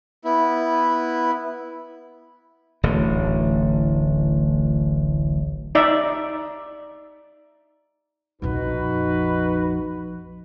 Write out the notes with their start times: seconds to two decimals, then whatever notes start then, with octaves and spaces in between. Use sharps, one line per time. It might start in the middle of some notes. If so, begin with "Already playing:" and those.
0.25 B3 E4
2.83 D1 A1 D3
5.75 D#4 D5 E5
8.42 A#1 F2 D#4 F#4 B4